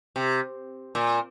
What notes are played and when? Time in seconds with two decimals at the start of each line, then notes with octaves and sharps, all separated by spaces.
0.16 C3
0.95 A#2